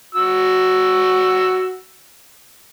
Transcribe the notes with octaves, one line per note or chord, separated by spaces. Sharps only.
F#4 E6